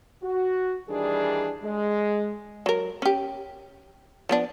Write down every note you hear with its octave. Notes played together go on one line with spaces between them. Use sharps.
F#4
D#3 E3 G3 D4 G#4
G#3
F#3 A#4
C#4 G4
F3 B3 D4